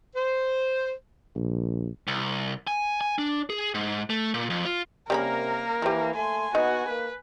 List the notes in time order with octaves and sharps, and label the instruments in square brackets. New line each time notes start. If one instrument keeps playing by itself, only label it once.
[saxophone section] C5
[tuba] A#1
[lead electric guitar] C2
G#5
G#5
D4
G#4
G#2
A3
A#2
F2
F4
[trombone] C3 [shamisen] G3 C#4 B5 [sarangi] A#3 [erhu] A#4
[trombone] E3 [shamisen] F3 G4
[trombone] A3 [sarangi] G#5 [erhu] C6
[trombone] B3 [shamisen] D#4 [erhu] F#4
[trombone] A#3 [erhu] B4